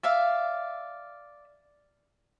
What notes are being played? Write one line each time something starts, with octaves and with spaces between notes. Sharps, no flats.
D5 E5 F5